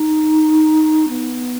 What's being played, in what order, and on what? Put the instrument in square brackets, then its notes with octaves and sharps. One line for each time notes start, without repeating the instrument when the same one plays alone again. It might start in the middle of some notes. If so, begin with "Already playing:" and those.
Already playing: [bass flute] D#4
B3